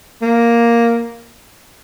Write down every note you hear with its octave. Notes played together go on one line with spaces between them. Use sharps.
A#3